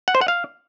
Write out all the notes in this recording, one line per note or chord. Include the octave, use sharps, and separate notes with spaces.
F#5
C5
F#5
F5